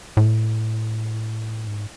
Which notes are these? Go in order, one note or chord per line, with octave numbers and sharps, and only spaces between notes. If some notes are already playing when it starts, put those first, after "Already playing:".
A2
G#2